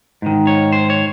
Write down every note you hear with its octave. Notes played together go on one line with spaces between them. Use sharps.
G#2 D#3
C#5
C5
C#5